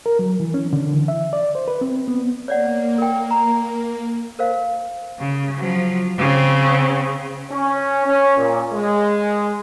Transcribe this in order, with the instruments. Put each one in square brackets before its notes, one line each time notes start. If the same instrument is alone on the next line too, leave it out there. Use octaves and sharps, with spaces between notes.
[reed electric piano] A#4
F#3
E3
C#4
D3
E3
E5
D5
C5
B4
C4
B3
[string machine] A#3 [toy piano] C#5 D5 F#5
[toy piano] A#4 G5
A#5
A#4 C5 F5
[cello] C#3
F3 F#3
C#3 C4
[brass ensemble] C#4
C#4
A#2
G#3